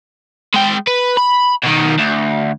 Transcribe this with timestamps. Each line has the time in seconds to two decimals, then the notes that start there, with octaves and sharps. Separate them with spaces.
0.54 G#3 G5
0.87 B4
1.17 B5
1.63 B2 D#3
1.98 D2